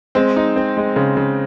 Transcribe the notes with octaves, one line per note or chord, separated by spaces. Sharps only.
G#3 C4
D#4
C4
G#3
C#3
C#3